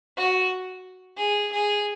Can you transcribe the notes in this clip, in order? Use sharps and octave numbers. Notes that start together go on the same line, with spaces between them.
F#4
G#4
G#4